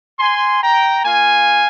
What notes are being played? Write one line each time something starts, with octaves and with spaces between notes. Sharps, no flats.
G#5 C6
G5 A#5
A#3 F4 F5 G#5